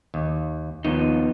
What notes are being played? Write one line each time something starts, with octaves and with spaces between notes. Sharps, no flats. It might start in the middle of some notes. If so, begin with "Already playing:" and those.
D#2
D#2 F3 B3 D#4